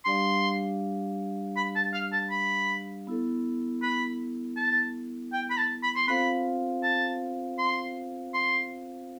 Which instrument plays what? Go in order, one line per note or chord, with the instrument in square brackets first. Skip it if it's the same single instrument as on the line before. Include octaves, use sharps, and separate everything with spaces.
[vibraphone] G3 D4 G4 D5 F5 [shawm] C6
[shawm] B5
A5
F5
A5
B5
[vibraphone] B3 E4 A4
[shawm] B5
A5
G5
B5
A5
B5
C6
[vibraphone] C4 F4 A4 C5 F5 [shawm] B5
[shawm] A5
C6
C6